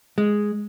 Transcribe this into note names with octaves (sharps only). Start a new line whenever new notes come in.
G#3